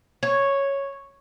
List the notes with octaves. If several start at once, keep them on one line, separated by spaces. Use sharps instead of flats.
C#5